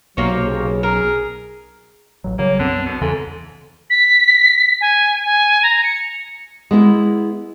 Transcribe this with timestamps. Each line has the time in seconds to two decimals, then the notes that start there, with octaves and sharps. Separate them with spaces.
0.17 B1 C3 F#3 A#3 C#5
0.39 C#3
0.83 G#4 A#4
2.24 A1 F#3
2.39 C#3 F#3 G3 A#3 C#5
2.59 B1 F#2 D3 B3 C4
2.86 B2
3.01 E2 G#2 C#3 E3 A4
3.90 B6
4.81 G#5
5.25 G#5
5.63 A#5
5.84 C#7
6.71 G#3 B3 E4